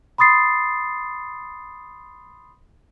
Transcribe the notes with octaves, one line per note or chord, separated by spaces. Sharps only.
B5 C6 D#6 A6 C7